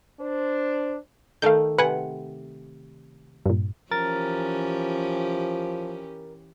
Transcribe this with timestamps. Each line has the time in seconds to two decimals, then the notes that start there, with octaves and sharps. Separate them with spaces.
0.21 D4 C5
1.42 D#3 A3 F5 G6
1.78 C3 B4 F#5 G#5
3.46 G2 A#2
3.91 E3 F3 C#4 G4 A#4 A6